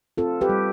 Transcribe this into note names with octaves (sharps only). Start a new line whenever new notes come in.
C4 F4 A4
G4 B4
G3